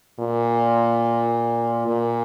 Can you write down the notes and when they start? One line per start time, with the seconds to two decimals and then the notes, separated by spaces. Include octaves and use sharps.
0.19 A#2
1.88 A#2